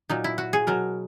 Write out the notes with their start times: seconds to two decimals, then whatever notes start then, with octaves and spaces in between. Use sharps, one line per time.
0.09 A#2 F#3 D#4
0.24 E4
0.38 F#4
0.53 G#4
0.67 B2 F#3 A#4